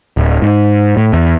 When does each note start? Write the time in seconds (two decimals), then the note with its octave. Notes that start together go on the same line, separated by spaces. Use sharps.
0.17 D1
0.42 G#2
0.97 A2
1.13 E2